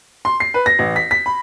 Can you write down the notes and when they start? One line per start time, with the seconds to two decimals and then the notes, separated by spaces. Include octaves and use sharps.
0.25 C6
0.40 C7
0.54 B4
0.66 A#6
0.79 A1
0.96 B6
1.11 B6
1.26 B5